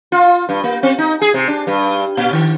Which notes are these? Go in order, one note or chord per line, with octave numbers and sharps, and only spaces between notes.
F4
G2
A#3
C4
D#4
G#4
C3
D4
G2
A#2
D#3